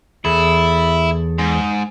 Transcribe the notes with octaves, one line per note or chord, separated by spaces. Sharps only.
E2 E4 G#4 A4
G#2